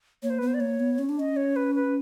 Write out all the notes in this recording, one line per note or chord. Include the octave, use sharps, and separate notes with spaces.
A#3 C#5
C5
B3 B4
C5
D5
A#3 C#5
B3
C#4
D4
C#4 D#5
C#5
B4
B4